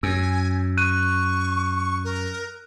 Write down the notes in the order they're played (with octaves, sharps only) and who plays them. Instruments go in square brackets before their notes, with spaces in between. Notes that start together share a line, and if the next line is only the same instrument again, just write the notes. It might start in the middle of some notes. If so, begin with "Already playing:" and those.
[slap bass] F#2 [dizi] G#5 [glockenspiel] E6
[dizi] C#6 [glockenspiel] F#6 D#7
[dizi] A#4